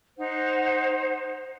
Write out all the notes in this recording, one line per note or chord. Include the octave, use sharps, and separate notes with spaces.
D#4 C5 F#5